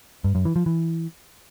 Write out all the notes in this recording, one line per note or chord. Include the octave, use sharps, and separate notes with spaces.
G2
F#2
E3
F3
E3